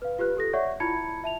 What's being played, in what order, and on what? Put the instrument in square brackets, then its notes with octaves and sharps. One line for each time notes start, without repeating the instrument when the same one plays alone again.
[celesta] B4 F5
F4 G4 B4 F#6
G4 A4 A#6
C#5 D5 E5 F#5 C#6
E4 F4 A5 B5 G#6 C#7
E5 A5 F7